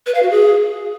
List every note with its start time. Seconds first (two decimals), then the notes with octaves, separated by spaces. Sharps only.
0.06 B4
0.15 F5
0.23 F#4
0.31 G#4